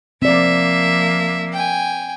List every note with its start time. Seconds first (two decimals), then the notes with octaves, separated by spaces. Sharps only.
0.22 F3 A#3 C4 D5 E5
1.52 G5 G#5